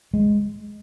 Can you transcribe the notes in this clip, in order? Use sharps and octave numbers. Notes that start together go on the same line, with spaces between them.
G#3